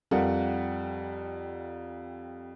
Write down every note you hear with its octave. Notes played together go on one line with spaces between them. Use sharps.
F2 G3 F4 A#4 F#5